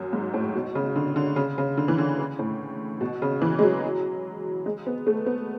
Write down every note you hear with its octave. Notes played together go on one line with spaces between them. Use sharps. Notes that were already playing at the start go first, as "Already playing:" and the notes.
Already playing: F#2
G#2
A2
B2
C#3
D3
D3
C#3
C#3
D3
E3
D3
C#3
A2
B2
C#3
E3
G#3
F#3
G#3
B3
A3
B3